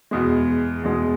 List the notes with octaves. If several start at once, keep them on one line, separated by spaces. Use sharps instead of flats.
E2 B2 G#3
E2 B2 G#3